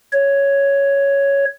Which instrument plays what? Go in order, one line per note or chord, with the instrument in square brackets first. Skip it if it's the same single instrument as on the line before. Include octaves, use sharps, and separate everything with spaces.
[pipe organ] C#5